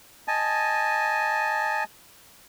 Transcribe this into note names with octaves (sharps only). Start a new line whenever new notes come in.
D#5 G#5 A5